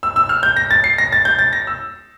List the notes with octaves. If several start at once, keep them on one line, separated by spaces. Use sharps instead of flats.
E6
E6
F6
G6
A#6
A6
C7
A#6
A6
G6
A6
A#6
E6